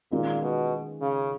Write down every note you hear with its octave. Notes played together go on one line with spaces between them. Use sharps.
A#2 D#3 G#3 C#4 F4
B2
C#3